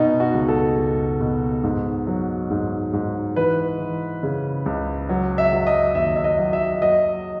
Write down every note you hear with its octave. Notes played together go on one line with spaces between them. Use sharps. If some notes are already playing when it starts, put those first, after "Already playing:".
Already playing: B2 D#4
F#4
C#2
A4
C#2
B2
G#2
F#3
G#2
G#2
E3 B4
E3
C#3
C#2
F#3
E5
F#3
D#5
D#2 E5
E5
D#5
F#3
E5
F#3 D#5